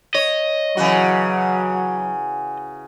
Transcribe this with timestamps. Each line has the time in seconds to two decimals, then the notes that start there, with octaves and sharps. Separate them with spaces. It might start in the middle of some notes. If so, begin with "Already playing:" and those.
0.14 C#5 D#5
0.77 C#3 E3 F#3 F#4